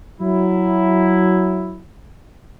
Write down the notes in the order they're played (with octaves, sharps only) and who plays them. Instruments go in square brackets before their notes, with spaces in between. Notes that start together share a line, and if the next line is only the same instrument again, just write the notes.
[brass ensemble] F#3 E4